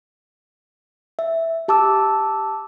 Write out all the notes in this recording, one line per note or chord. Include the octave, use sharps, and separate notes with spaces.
E5
G4 A5 D6 E6